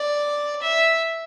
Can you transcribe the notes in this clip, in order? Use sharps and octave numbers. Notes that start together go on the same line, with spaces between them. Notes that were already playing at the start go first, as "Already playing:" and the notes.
Already playing: D5
E5